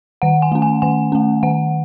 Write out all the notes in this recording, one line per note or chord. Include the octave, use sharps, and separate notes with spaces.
D#3 F#5
G#5
A3 C#4
G#5
D#3 G#5
A3 C#4
D#3 F#5